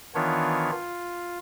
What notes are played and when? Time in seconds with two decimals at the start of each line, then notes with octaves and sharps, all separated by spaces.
0.15 D#3 E3 B3 D4 F4 C#5
0.72 F4